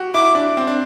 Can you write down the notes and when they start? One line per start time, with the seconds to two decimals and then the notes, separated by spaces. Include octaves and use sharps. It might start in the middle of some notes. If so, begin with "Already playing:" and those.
Already playing: F#4 G4
0.14 E4 D6
0.35 D4
0.57 C4
0.67 D4